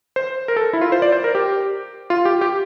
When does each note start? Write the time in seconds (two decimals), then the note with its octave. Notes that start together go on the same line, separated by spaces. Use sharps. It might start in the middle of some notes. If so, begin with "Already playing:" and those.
0.16 C5
0.48 A#4
0.56 A4
0.73 E4
0.81 F4
0.92 C5
1.02 D5
1.12 C5
1.24 A#4
1.35 G4
2.10 F4
2.25 G4
2.41 G4